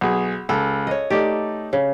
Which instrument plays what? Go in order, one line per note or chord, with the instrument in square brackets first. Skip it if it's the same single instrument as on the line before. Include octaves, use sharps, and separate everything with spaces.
[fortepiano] B1 G#4
[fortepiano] C#2 [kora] A4
[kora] C#5 D#5
[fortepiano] A3 D#4 D5 [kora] G4
[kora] C#3